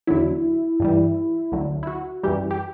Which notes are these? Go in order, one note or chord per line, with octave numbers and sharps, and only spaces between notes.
E2 D3 F#3 E4
G2 E3 G3
D2 D3 F#3
E4
F#4
F#2 E3 G3 G4
G4